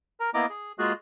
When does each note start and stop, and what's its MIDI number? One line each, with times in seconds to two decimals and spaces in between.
0.20 0.30 70
0.20 0.30 82
0.34 0.46 58
0.34 0.46 59
0.34 0.46 64
0.34 0.46 75
0.34 0.46 82
0.34 0.46 86
0.49 0.72 68
0.79 0.93 56
0.79 0.93 58
0.79 0.93 65
0.79 0.93 66
0.79 0.93 68
0.79 0.93 90